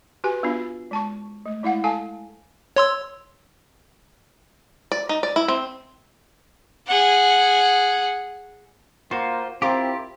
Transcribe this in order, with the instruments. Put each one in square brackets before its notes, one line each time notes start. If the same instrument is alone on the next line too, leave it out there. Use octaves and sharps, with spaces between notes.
[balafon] F#4 G4 B4 G#5
B3 D4 F4
G#3 A5 C#6
A3
G#3 E4 F5 F#5
A4 F5 G#5 A5
[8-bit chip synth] C#5 C6 E6
[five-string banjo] D5
D#4
D5
E4
C4
[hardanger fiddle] G#4 F#5
[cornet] A#3 [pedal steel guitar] F4 C5 [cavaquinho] F#4
[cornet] C4 [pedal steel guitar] E4 G4 [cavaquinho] F4 A#4 D6